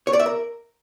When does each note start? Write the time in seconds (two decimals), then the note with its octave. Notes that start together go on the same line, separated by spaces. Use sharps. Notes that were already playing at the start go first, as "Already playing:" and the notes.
0.07 C#5
0.13 D5
0.20 E5
0.26 A#4